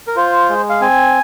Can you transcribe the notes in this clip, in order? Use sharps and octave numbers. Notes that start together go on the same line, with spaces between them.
A#4
F4 C5
G#3
F5
C4 G#5